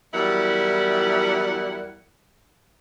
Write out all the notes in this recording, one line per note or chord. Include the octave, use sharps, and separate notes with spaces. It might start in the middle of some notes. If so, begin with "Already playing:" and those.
E2 F#3 G3 E4 A#4 F#5